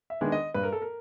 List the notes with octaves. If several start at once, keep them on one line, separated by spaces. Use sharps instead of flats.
E5
D#3 G#3 B3 D4
D#5
G2 B4
A#4
A4
A#4